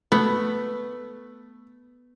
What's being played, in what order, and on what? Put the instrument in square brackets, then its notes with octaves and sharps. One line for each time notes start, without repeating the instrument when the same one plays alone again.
[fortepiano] A3 [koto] B3